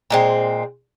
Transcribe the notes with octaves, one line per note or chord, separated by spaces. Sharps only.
A#2 G#3 C4